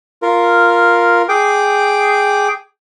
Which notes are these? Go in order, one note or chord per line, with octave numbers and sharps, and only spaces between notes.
F4 A#4
G#4 G5 D6